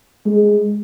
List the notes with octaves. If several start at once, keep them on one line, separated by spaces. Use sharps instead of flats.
G#3